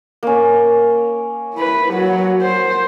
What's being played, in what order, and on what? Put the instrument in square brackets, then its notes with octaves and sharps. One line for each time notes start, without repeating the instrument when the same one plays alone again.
[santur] A#3 C#4
[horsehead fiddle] E4 B4
F#3 F#4
C5